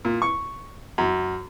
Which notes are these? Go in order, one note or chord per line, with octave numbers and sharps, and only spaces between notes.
A#2
C#6
F#2